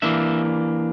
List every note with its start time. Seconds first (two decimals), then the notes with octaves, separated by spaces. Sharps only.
0.02 E3 A#3 D4 E5